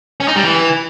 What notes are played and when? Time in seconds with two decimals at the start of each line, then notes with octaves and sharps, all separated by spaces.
0.20 C#4
0.28 D#4
0.36 G3
0.43 E3